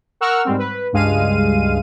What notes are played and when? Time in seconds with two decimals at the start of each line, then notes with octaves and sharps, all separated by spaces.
0.21 A#4 F#5 C#6 E6 F6
0.45 G#2 G3 C4
0.59 B4
0.92 C#2 G2 G#3 F5 D#7